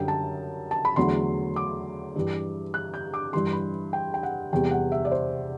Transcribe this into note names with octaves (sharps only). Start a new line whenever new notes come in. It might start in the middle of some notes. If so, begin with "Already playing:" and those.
Already playing: F#2 D3 G3 G5
A5
A5
B5
E2 D3 F#3 A3 C6
D6
G2 E3 G3
F#6
G6
D6
G2 E3 G3 C6
C6
B5
G5
G5
F#5
E2 C3 G3 G5
F#5
E5
D5
C5